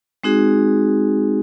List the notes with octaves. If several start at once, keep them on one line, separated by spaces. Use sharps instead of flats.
G#3 C4 D#4 F#4 G#4